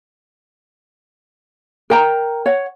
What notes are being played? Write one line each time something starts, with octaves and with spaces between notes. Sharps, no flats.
A#4 G5 A#5
C#5 F#5